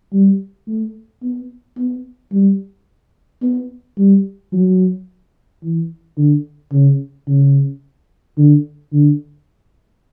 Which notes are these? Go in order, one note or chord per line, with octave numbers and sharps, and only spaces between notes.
G3
A3
B3
B3
G3
B3
G3
F#3
E3
D3
C#3
C#3
D3
D3